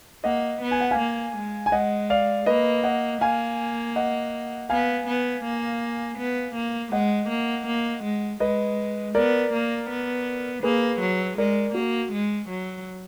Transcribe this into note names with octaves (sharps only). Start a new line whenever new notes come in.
A#3 D#5 F#5
B3
G#5
F#5
F5 G#5
A#3
G#3
G#5
G#3 D#5 F#5
D5 F5
A#3 B4 D#5
D#5 F#5
A#3 F5 G#5
D#5 F#5
B3 F5 G#5
B3
A#3
B3
A#3
G#3 D#5 F#5
A#3
A#3
G#3
G#3 B4 D#5
B3 A#4 D5
A#3
B3
A#3 G#4 B4
F#3
G#3 A#4 D5
A#3 F#4
G#3
F#3